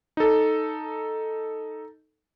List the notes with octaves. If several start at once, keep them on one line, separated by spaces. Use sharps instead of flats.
D#4 A4